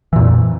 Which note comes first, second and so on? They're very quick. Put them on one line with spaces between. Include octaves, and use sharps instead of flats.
E3 A#2 F2